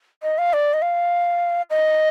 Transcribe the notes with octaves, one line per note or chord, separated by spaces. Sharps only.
D#5
F5
D5
D#5
F5
D#5